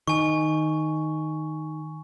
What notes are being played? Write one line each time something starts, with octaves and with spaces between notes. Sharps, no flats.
D#3 G#5 C#6